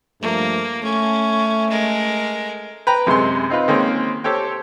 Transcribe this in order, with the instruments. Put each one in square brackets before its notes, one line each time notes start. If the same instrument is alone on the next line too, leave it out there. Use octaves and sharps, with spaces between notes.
[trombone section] G2 F3 A3 [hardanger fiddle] A#3
[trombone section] A3 [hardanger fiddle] C#4
[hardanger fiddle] G#3 A#4
[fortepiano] B4 G5 A#5
F#2 C3 G#3 C6
C4 D#4 F4 B4
D#3 G#3 A#3 C4 C#4
G4 A4 C5 C#5 G5